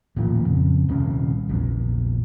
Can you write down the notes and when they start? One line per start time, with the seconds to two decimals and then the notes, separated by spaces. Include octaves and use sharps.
0.17 D#1 A1 A#2 F3
0.45 F2 C#3
0.89 D#1 C2 C#4
1.49 A#1 E2